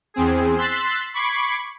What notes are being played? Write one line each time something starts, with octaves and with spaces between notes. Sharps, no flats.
E2 C4 G#4
C6 E6 F#6 A6 B6
B5 C#6 D6 G#6 C7